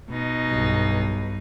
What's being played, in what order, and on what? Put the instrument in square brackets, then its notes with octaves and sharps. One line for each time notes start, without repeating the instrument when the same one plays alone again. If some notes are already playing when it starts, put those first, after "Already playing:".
[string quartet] B2 D#4
[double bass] B1 G2